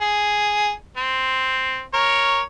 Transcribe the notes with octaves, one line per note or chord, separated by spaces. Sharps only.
G#4
C4
A#4 C#5